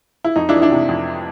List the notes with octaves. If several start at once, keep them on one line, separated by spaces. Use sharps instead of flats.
E4
F2 D#4
D4 E4
E3
D4 E4
C3
F2